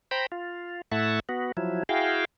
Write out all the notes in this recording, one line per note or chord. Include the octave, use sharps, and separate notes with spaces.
C5 G5 A#5 B5
F4
A2 A3 E4 E5 F#5 A5
B3 F#4
F3 F#3 E4
E4 F#4 G#4 F5 G5